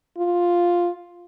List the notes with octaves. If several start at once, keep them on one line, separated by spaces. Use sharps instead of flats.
F4